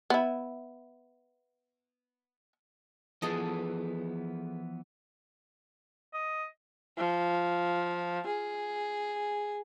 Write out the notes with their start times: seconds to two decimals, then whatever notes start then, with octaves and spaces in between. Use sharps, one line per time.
0.10 B3 E4
3.22 E3 F3 B3 G#4 A4 D#5
6.14 D#5
6.98 F3
8.27 G#4